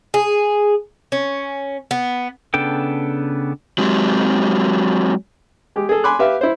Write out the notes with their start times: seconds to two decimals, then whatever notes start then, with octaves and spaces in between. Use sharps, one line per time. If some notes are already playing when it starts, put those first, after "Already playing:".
0.14 G#4
1.12 C#4
1.91 B3
2.54 C#3 B3 D4 A4 G5
3.78 F#3 G#3 C4 G4
5.76 G#3 G4
5.89 G#4 A4
6.04 G#5 B5 C6 D6 F#6
6.19 G4 B4 E5 F5
6.41 E4 C5